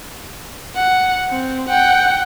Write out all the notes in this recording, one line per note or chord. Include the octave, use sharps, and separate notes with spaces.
F#5
C4
F#5 G5